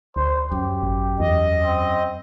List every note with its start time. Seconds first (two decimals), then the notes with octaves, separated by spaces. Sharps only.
0.16 D2 C5
0.52 F#2 G4
0.83 G#1
1.20 E2 D#5
1.63 C4